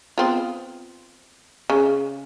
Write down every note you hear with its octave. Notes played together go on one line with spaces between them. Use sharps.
B3 C4 F4
C#3